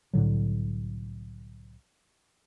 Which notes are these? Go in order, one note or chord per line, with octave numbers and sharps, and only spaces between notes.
C2 A2 D3 F#3